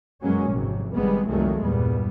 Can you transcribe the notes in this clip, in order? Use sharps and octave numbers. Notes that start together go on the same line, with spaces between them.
F#2 B2 F#3 G#3 A#3 C#4
G#1 F2 C3 F#3
G#1 G3 G#3 B3
C2 F2 D#3 F#3 G#3 A3
E2 G2 A#2 G3 B3